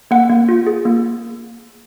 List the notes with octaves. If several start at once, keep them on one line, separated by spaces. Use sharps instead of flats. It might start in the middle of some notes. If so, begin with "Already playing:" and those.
A#3 F#5
A#3
F4
G#4
A#3